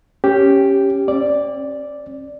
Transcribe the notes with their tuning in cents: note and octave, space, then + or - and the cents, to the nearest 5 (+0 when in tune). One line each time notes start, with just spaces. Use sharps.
C#4 +0 G4 +0
C#4 -45 D5 +0